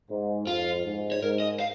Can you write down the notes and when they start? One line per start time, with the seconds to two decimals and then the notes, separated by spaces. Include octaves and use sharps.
0.10 G#2
0.47 F2 F4
0.85 G#2
1.12 C#5
1.22 G#2 A#4
1.40 D#5
1.60 F5